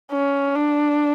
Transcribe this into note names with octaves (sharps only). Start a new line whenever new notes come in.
C#4
D4